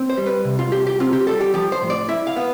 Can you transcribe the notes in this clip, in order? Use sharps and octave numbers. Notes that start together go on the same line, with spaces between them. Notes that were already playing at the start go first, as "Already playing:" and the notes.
Already playing: C4
C5
G3
B4
C3
F4
C2 G4
G4
C4 F4
G4
G3 A4
G4
F3 G4
C5
A2
D5
E4 E5
F5
B3